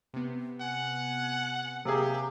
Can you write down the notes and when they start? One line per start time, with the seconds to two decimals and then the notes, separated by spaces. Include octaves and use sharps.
0.14 C3 B3
0.61 F#5 G#5
1.85 C3 A#3 G4 G#4